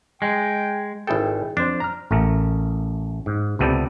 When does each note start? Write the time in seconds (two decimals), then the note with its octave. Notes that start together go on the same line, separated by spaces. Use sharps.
0.22 G#3 G5
1.07 G#1 E4 G#4 A4 G5
1.57 F2 D4 C5
1.80 A#5 F6
2.11 A1 A3 A#4
3.26 G#2
3.59 C#2 C3 B3 A4 D5 G5